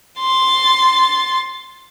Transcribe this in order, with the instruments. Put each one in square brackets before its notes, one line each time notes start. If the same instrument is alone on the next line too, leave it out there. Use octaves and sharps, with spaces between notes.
[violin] C6 A6